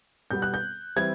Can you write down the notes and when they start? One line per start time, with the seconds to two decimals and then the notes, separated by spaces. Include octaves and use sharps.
0.31 B2 G3 B3 G6
0.42 F#6
0.54 G6
0.96 E3 G3 C4 E4 G#6